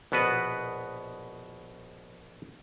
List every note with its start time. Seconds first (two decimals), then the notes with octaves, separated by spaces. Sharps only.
0.12 A#1 B2 B3 F#4 B4